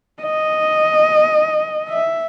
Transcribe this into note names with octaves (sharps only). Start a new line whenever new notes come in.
D#5
E5